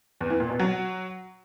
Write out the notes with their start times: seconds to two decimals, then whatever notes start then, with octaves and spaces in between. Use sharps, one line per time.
0.21 E2
0.30 E3
0.40 A#2
0.50 B2
0.59 F#3